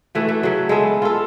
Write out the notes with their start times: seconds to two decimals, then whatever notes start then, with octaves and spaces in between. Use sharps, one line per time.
0.15 E3 A3 F#4
0.29 A3
0.43 C#3 F#3
0.69 G#3 B3 A4 E5
1.02 F4 A4